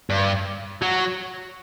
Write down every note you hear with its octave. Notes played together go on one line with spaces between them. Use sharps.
G2
F#3